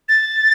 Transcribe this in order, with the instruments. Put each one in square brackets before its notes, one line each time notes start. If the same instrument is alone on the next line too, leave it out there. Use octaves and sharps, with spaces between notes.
[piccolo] A6